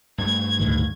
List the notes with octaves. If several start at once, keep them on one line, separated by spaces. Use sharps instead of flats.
G2 A3 G#6
D2 A2 D#3